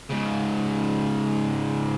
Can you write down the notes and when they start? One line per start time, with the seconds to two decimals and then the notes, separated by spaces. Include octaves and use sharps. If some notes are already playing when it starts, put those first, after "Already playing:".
0.10 G#2 C#3